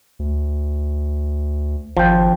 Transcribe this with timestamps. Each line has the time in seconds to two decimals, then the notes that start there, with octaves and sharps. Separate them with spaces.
0.19 D2
1.97 G#1 F3 G5